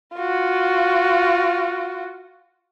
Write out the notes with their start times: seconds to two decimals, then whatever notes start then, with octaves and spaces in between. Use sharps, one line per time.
0.17 F4 F#4